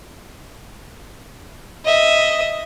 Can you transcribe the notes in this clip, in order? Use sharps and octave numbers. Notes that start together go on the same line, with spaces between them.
D#5 E5